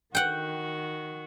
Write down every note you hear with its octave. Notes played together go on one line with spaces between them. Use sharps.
D#3 F#4 F#5 G5